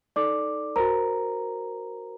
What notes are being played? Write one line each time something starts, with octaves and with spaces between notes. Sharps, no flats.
D#4 A4 D5 D6
F#4 A#4 C5 A#5